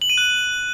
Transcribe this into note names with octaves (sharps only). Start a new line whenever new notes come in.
F#7
D#7
F#6